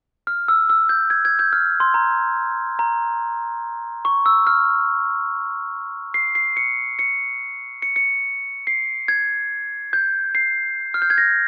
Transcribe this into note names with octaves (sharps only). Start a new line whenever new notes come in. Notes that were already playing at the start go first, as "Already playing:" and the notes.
F6
E6
E6
G6
G#6
G#6
G6
F6
C6
A#5
A#5
C#6
E6
F6
C7
C7
C#7
C#7
C#7
C#7
C7
G#6
G6
C7
F6
G6
G#6
A#6